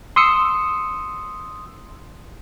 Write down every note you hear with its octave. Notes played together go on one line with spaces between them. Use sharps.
C6 D#6 E6 C#7